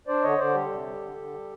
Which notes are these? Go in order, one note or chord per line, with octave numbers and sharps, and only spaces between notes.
D4 C5 D5
D3 C#5 D#5
D3 C5 D5
G3 G4 A4
C3
G3
D3
D3
G3